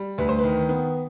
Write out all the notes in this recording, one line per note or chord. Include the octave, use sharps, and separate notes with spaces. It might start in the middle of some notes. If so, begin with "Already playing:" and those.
Already playing: G3
D2 B4
C5
D#3 B4
B3